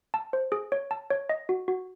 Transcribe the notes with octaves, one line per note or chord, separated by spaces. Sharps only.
A5
C5
G#4
C#5
A5
C#5
D#5
F#4
F#4